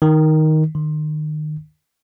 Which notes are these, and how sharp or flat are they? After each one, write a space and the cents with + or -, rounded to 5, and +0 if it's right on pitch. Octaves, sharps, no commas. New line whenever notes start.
D#3 +5
D#3 -30